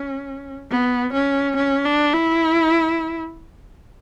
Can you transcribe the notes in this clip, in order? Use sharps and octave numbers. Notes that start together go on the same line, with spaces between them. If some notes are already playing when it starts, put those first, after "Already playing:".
Already playing: C#4
B3
C#4
C#4
D4
E4